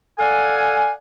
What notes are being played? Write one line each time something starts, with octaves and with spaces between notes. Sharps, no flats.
A4 D5 F5 F#5 G#5